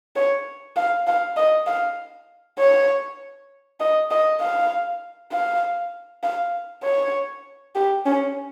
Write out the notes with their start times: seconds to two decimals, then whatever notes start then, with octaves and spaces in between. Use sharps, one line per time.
0.16 C#5
0.76 F5
1.07 F5
1.37 D#5
1.67 F5
2.59 C#5
3.80 D#5
4.11 D#5
4.41 F5
5.32 F5
6.24 F5
6.84 C#5
7.75 G4
8.06 C#4